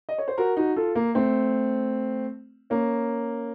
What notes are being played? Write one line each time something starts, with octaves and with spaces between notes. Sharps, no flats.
D#5
C#5
C5
F#4 A#4
D#4 F#4
F4 A4
A#3
A3 C4
A#3 C#4